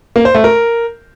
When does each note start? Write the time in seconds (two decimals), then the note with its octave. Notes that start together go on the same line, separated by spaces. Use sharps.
0.16 A#3
0.25 C5
0.35 A3
0.44 A#4